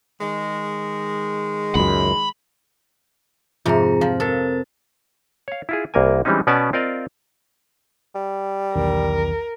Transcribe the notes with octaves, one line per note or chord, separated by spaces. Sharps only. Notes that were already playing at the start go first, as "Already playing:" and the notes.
D#3 G#3
C#2 F#2 B5
F2 G#2 C3 F4 G#4 A#5
F3 F5
C4 A4 A#4 A6
C#5 F5
E4 F4 G#4
C2 A#3 A#4 G#5
E3 G3 G#3 C4 C#4 D#4
B2 B3 C#4 D5 G#5 A5
C4 F4 A#4 D5 D#5 F5
G3
B1 E2 D#3 A#4